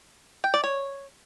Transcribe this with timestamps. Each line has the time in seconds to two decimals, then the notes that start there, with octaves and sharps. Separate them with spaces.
0.44 G5
0.54 D5
0.64 C#5